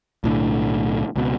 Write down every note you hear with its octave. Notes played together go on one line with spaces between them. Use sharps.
B1 A2 D3
C#2 B2